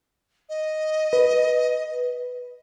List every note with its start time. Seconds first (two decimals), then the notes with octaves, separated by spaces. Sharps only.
0.49 D#5
1.13 B4